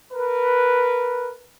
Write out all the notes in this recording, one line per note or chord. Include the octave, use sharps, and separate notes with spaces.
A#4 B4